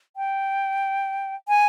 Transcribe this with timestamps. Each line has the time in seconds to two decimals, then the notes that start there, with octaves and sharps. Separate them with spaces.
0.16 G5
1.48 G#5